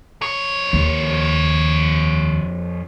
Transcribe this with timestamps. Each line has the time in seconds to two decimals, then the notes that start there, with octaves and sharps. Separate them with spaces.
0.22 F2 C#5
0.73 D#2